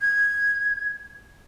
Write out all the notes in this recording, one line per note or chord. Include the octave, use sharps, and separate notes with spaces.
G#6